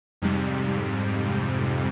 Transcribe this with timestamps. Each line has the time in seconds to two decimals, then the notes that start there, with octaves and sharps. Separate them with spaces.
0.22 F2 G#2 C3 G3